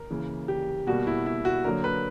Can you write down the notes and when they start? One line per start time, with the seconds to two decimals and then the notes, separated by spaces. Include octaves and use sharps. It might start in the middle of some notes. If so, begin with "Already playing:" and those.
Already playing: A#4
0.10 C#3 E3 A#3
0.48 G4
0.87 B2 G3 A#3 F#4
1.07 E4
1.26 E4
1.45 F#4
1.64 D3 F#3 A#3 A#4
1.84 B4